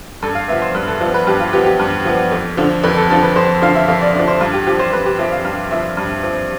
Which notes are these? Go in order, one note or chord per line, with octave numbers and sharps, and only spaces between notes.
G2 A4
F5
F3 B3 E5
C5
G2 B4
A4
F3 B3
B4
G2 G4
F4
F3 B3 G4
G4
G2
F3 B3
F2
D3 F3
F2 B4
A4
D3 F3 A4
B4
F2 C5
D3 F3 F5
E5
F2 F5
D5
D3 D5
F3
C5
G2 F4
G4
F3 C4 G4
C5
G2 B4
G4
F3 C4 E5
F5
G2 F5
F3 C4 E5
G2
F3 C4